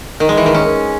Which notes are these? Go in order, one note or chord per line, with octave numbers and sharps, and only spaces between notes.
D#3
G#3
E3
D#3
C#4